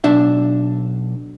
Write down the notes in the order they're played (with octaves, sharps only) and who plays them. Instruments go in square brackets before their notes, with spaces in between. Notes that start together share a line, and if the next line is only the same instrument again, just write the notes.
[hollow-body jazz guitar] B1 D4 E5